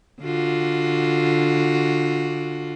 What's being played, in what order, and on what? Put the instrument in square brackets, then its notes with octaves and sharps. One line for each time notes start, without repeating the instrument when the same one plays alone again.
[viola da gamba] D3 F4 F#4